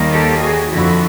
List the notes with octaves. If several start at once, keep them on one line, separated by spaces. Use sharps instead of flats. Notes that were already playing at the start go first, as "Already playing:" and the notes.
Already playing: D#2 D#3 G3 A#3
G4 A4
F#4 G#4
F2 D3 F3 E4 F#4